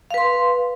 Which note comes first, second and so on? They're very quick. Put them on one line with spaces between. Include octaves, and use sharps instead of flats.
F5 B4 C6